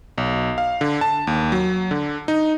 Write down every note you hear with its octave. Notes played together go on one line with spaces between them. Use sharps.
B1
F5
D3
A5
D#2
F#3
D3
D#4